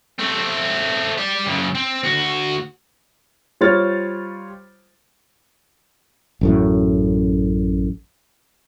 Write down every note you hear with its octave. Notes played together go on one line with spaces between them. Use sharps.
A3 C4
G4 D5
F#2 C#3
C4
D2 F#4
G3 F4 C5 C#5 F6 A6
A1 F#2 A2